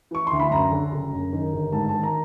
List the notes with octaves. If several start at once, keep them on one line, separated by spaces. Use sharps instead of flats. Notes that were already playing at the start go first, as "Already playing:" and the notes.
E3 C#6
D2 C6
B5
F#2 A#5
D3
F#1
F#2
D#3
G1
G#2 A5
A5
D#3
A#5